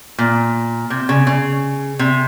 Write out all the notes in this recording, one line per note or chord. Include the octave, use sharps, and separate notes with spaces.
A#2
C3
C#3
C#3
C3